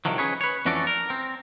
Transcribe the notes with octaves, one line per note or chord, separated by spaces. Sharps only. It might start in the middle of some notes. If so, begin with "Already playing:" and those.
C2 C3 D#3 F3 F#3
C#4 G#4 B4 C#5
B4 C#5
F2 E3 C#4 F#4 A4 D5
A#4
C4